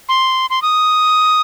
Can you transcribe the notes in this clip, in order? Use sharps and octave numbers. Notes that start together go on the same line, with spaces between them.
C6
C6
D#6